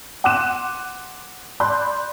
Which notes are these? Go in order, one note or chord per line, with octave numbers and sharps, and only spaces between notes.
F#5 C6 D6 F#6 D#7 E7
D5 B5 C6 F#6 G6